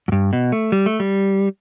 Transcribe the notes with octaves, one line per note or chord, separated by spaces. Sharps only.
F#2
G2
B2
A3
G3
A3
G3